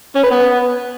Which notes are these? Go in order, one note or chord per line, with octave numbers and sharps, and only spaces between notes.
C#4
B4
B3